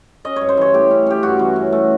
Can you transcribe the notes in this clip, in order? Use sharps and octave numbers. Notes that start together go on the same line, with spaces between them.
C#4 D#5
C#5
G2
C5
E3 C#5
A3 G4
C#4
C#4 G4
G2 F#4
E3
C#4
A3